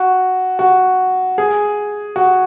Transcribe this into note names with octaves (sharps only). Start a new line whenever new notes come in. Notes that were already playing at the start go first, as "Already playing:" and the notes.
Already playing: F#4
F#4
G#4
F#4